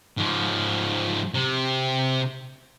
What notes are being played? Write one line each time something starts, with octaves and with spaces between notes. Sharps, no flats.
G#2 F3
C3